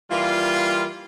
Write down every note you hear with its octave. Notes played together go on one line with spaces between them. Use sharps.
E3 G3 A#3 F4